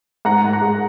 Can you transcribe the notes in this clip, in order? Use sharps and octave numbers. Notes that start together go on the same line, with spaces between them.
G#2 F#5 A#5
G#2
F#5 A#5
G#3